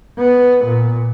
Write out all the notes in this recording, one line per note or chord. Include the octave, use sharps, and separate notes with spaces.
B3
A#2